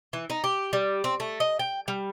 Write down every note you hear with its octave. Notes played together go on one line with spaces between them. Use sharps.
E3
D#4
G4
G3
C4
A3
D#5
G5
G3